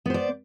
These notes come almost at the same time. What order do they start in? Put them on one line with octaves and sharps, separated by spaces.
B3 C5 D5